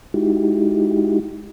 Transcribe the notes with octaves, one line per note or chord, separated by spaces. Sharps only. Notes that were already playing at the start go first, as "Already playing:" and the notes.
G#3 D#4 E4 F#4 G4